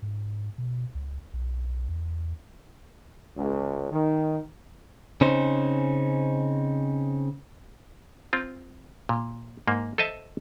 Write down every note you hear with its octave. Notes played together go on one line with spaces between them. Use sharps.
G#2
B2
C#2
B1
E2
C#2
D#3
C#3 C4 C#4 D#4 C5
C4 F4
A#2
G#2 A#3
A4 C5 D#5 E5 A5